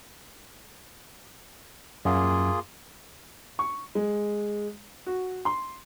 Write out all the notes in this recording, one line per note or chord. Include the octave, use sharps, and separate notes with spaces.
F#2 A#3 F4 G#4
C#6
G#3
F#4
C6